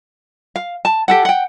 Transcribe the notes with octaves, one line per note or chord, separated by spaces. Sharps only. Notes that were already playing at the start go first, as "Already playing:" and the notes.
F5
A5
G4 A4 F#5
F#5 G5